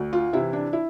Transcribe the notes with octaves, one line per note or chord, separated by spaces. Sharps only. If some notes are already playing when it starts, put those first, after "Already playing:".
Already playing: D2
F4
C3 E3 E4
D4
E4